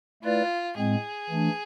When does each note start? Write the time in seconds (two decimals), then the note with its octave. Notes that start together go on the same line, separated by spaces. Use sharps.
0.23 A3 E4 F4 B4 D5
0.77 A2 G#3 C4 G#4
1.30 E3 A3 D4